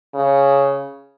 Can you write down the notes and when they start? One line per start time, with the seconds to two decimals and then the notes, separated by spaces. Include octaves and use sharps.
0.15 C#3